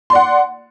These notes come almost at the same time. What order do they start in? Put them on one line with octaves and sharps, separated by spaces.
C6 D5 F#5